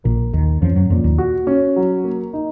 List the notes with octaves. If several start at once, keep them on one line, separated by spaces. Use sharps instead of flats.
A#1 A#2 A#3
D#2 D#3 A#3
F2 F3 C#4
F#2 F#3
F2 A#2 F3
D#2 D#3
F#4
C#4
F#3
A#3
D#4